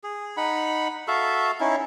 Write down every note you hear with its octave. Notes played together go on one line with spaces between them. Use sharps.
G#4
D#4 F#5 B5
F#4 A4 E5 F5
C#4 D#4 E4